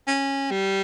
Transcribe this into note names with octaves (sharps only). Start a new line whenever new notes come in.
C#4
G3